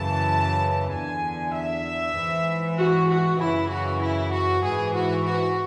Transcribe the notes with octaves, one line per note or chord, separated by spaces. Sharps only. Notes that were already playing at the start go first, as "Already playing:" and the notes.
Already playing: F#2 C#3 E3 A5
E2 D3 G#5
E5
G#2 E3
F#4
F#4
F#2 C#3 E3 E4
F#4
E4
F#4
G#2 E3 G#4
F#4
F#4